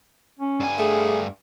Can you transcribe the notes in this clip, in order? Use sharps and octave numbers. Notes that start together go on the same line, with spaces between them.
C#4
G2 G#5
A3 G#4